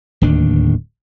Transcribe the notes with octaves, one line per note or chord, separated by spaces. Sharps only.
D1 D#2 D#3 D4